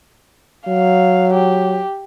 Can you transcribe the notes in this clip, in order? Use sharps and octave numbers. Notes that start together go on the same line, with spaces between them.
F#3 F5
G4